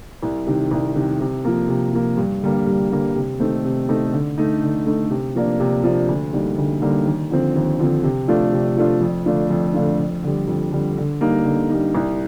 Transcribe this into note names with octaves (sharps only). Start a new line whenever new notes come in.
C2
C3 D#3
C2
C3 D#3
C3
F3 A#3
C3
F3 A#3
G2
D3 G3 A#3
G2
D3 G3 A#3
C3
D#3 A3 C4 D#4
C3
D#3 A3 C4 D#4
D3
A3 D#4
D3
A3 D#4
C3
F3 A#3 D4
C3
F3 A#3 D4
D2
D3 G3 A#3 D#4
D2
D3 G3 A#3 D#4
D#2
D3 F3 C4
D#2
D3 F3 C4
C3
F3 A3 D4 F4
C3
F3 A3 D4 F4
F2
D3 A3 D4 F4
F2
D3 A3 D4 F4
F2
D3 G3
F2
D3 G3
D3
G3 A#3 D#4
D3
G3 A#3 D#4
C2